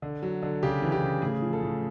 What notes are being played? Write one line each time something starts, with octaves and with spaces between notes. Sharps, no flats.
D3
F#3
D3
C#3 G4
E3
G4
C#3
A2 G#4
F3
A4
A2